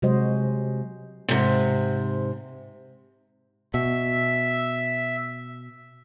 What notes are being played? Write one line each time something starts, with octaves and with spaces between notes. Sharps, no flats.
C3 F#3 G#3 F#4 C5 D#5
G#2 C3
B2 E5